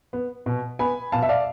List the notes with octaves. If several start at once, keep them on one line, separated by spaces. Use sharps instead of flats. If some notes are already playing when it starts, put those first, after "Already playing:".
B3
B2
B3 G#5 B5
B2 F5 A5
E5
D5 F5